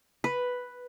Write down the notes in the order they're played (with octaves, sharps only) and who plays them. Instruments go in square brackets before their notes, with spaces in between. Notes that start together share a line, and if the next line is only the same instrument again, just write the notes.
[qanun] B4